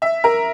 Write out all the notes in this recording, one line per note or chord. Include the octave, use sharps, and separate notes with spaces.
E5
A#4